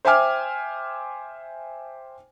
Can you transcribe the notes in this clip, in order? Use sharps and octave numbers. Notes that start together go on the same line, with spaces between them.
C5 E5 G5 G#5 D6 F6